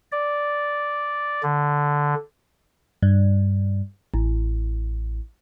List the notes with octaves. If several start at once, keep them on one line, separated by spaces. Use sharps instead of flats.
D5
D3
G2
A1